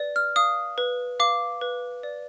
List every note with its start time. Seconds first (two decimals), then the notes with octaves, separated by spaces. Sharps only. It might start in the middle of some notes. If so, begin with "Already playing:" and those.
Already playing: B4 D5
0.16 F6
0.36 F5 D#6
0.78 B4
1.20 F5 D6
1.61 B4
2.03 D5